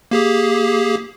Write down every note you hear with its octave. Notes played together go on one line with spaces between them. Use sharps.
A#3 G4 G#4